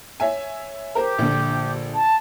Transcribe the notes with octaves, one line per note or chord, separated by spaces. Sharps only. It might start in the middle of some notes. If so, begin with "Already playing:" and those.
C#5 E5 G#5
G4 A#4 C5
A#1 D3
A5